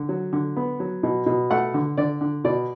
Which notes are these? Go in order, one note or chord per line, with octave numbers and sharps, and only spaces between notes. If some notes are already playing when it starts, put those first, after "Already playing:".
Already playing: D3
F#3
D3
B3
F#3
B2
B2
A3 F#5
D3
D3 D5
D3
B2 D5